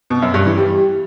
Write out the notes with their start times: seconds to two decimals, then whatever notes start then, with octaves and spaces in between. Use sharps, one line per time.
0.10 B2
0.22 F#2
0.34 G2
0.46 E3
0.58 G3